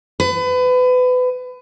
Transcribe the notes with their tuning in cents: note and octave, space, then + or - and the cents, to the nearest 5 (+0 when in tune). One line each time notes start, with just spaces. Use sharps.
B4 +30